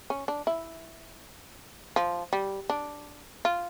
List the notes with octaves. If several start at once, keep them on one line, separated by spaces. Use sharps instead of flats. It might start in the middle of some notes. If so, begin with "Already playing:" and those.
C#4
D4
E4
F3
G3
D4
F4